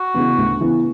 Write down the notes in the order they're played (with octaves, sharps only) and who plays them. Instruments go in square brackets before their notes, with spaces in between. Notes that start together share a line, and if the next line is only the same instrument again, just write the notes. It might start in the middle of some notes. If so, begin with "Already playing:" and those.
Already playing: [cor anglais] F#4
[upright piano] C#3 E3 B3
D2
C#3 E3 B3